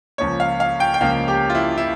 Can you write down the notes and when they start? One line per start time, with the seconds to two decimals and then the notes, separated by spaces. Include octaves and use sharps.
0.18 C#2 C#3 F3 A#3 C#5
0.40 F5
0.60 F5
0.80 G5
0.94 G5
1.01 C#2 C#3 F3 A#3 F5
1.28 G4
1.50 F4
1.55 E4
1.78 E4